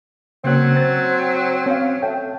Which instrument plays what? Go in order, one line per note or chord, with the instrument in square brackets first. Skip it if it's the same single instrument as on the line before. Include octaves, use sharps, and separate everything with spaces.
[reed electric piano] C#3 A#3 F#6 [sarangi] F#3 [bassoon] C4
[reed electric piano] C5 A6
[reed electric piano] C4 F5 [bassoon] C#4
[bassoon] A3 [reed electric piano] G5